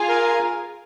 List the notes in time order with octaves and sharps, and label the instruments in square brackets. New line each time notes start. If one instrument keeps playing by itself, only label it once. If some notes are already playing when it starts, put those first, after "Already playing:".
Already playing: [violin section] F4 G#4 F5 G#5
[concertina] A#4